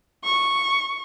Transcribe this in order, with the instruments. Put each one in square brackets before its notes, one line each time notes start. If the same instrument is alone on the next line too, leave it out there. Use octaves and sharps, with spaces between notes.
[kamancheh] C#6